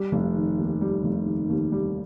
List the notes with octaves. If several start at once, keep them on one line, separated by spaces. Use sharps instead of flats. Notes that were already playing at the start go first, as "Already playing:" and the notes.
Already playing: G3
F1
D#3
D#2
G3
F1
D#3
D#2
G3